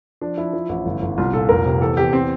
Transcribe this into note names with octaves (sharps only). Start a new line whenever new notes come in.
F3 D4
F3 E4
F3
A1
G1
G1
C2 F4
A#2 A4
F1 A#4
C3
E2 A4
E2 G4
C4